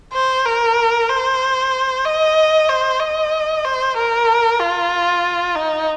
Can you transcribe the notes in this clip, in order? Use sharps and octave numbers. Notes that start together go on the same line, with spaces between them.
C5
A#4
C5
D#5
C5
D#5
C5
A#4
F4
D#4